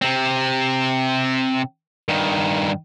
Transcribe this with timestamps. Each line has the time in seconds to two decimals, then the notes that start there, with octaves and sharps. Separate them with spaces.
0.02 C3 C4
2.08 G2 D#3